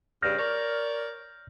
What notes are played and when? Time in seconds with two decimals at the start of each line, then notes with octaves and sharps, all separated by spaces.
0.22 G2 C#3 G3 F6 G6 A#6
0.38 A#4 C#5 D5